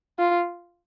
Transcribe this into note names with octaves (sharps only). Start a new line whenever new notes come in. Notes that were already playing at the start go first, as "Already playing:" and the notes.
F4